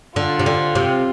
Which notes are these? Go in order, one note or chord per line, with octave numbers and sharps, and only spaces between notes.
D3 F4
C3
D3
C3